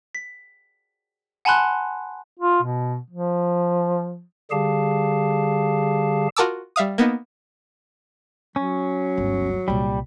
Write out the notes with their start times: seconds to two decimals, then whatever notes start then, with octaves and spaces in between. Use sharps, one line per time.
0.15 B6
1.45 F#5 G#5 A5 B5 C6 F#6
2.39 F4
2.62 B2
3.10 F3
4.51 D3 G3 G4 G#4 F5 A5
6.37 F4 F#4 A#4 A5 D6 E6
6.76 G3 E5 F5 D#6
6.98 A#3 B3 D#4
8.56 F#3 C#4
9.17 G1 D2
9.68 C2 A#2 G3